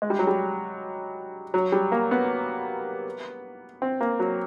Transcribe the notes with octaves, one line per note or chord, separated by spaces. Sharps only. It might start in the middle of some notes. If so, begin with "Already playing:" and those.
G#3
G3
F#3
G3
F#3
G3
A#3
B3
C4
A#3
F#3